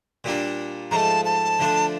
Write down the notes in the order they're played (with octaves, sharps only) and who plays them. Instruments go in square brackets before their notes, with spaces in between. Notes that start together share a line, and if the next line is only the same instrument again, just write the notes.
[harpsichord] A#2 G3 A#3 D4
[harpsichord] G#2 F3 A3 [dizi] A5 A#5
[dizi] A5
[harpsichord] D3 F3 A3 D4